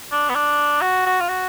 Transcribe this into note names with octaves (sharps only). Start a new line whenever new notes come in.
D4
B3
D4
F#4
F#4
F4
F#4